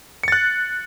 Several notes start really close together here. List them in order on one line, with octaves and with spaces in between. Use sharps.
C#7 A6 F#6